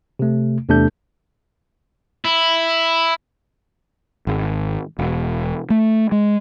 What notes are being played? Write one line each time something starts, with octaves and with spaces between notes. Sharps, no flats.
C3 A3
E2 C3 A3 D4 A4 G6
E4
G#1
E1
A3
G#3